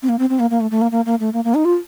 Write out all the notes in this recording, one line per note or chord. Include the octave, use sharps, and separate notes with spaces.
C4
A#3
C4
C4
A#3
A#3
A3
A3
A#3
A#3
A#3
A3
A#3
A#3
D#4
F4